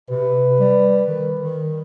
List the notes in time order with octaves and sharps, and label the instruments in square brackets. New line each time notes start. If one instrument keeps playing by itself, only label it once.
[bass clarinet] C3 [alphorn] B4
[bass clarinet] G3
D#3
D#3